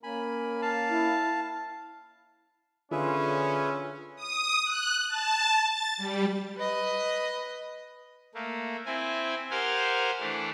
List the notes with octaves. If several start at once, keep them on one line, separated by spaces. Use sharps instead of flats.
A#3 C#4 A#4 G#5 B5
F5 A5
E4
D3 C#4 F4 G#4 B4 E5
D#6
F#6
A5
A6
G3
B4 D#5
A3 A#3
C4 E4 G#5
G4 A#4 C5 F5 F#5 G#5
E3 A3 D4 E4